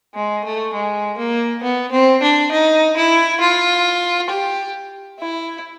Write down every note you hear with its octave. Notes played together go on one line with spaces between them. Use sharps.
G#3
A3
G#3
A#3
B3
C4
D4
D#4
E4
F4
G4
E4